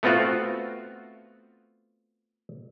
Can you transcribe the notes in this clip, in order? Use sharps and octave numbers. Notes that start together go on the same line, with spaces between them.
A3 B3 C4 F4 F#4